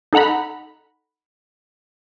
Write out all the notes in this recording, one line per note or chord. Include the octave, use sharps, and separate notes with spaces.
D#4 A4 F#5 A#5 B5